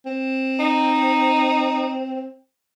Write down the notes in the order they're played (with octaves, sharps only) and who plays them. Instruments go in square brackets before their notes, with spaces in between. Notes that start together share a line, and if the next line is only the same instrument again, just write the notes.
[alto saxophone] C4
[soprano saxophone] D#4